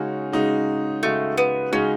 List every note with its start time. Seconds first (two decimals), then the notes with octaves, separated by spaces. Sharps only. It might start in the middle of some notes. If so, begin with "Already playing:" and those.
Already playing: C#3 G#3 C#4 D#4 F#4
0.32 C#3 G#3 D#4 F#4
1.03 C#3 G#3 A3 D#4 F#4
1.38 B3
1.72 C#3 G#3 C#4 D#4 F#4